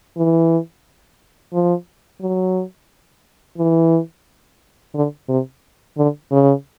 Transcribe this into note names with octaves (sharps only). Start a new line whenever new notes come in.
E3
F3
F#3
E3
D3
C3
D3
C#3